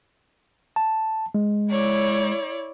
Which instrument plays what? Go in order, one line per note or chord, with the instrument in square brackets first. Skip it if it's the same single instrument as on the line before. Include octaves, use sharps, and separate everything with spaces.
[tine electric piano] A5
G#3
[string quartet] E4 C#5 D5